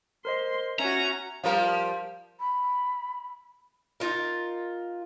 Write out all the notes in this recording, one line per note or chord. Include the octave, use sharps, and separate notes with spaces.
A#4 C5 D#5 C6
C#4 F#4 E5 A#5
F3 G3 A#4 F5
B5
D#4 F4 A#4